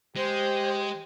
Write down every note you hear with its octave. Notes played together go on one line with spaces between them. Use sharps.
G#3 G4 C5